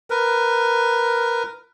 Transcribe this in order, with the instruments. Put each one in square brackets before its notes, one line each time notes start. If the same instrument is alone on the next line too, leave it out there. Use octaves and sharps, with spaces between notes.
[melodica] A#4 B4